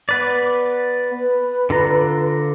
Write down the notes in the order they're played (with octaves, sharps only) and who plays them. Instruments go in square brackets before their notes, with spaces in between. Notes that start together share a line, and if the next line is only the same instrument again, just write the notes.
[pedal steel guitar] B3 B4 D5
[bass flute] B4
[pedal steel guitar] D3 F4 A#5